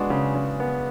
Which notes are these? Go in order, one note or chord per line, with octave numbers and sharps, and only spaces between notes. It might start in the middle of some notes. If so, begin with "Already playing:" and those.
Already playing: G#3 B3 D4 F#4
C#3
C#3
B3